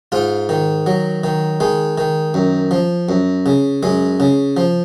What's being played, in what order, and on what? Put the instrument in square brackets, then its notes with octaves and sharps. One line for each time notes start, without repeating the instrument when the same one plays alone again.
[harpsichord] G#2 F4
D#3
F#3
D#3
D#3 G#3
D#3
F#2
F3
F#2
C#3
F#2 G#3
C#3
F3